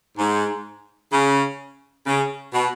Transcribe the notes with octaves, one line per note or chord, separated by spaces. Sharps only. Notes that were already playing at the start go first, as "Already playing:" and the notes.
G#2
C#3
C#3
B2